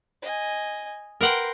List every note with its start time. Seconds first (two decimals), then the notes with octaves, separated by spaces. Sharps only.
0.22 D#5 G#5
1.21 A#4 B4 F#5 G5 C6